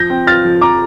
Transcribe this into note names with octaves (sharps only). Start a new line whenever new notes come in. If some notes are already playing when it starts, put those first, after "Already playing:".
Already playing: F3 G6 A#6
C4
F4 F6 A6
F3
F3 A#5 D6